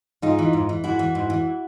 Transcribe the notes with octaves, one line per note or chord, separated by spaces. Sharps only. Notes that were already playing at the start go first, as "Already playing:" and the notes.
G#2 D#4 F4
E3
G#2
E3
G#2 E4 F#4
E3
G#2
E3